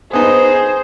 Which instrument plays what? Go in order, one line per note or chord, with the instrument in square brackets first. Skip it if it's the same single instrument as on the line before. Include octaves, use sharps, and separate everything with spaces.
[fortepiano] B3 D#4 [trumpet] G#4 [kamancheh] C5